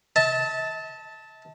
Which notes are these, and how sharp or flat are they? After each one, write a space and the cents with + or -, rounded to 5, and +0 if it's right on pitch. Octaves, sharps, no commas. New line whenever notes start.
E5 -45 A5 +0